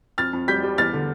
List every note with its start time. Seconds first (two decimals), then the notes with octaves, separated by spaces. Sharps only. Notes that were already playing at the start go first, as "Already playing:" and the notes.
0.18 F2 F6 A6
0.33 F2
0.48 G3 G6 B6
0.63 G3
0.78 E2 F6 A6
0.93 D3